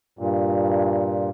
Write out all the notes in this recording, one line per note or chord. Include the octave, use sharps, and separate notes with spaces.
G2 A#2